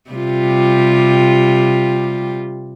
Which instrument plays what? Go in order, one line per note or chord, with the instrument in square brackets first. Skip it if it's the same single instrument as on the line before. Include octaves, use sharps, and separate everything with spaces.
[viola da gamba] C3 G3 F4